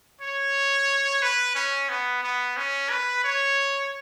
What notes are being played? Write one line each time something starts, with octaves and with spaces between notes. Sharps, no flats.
C#5
B4
C#4
B3
B3
C#4
B4
C#5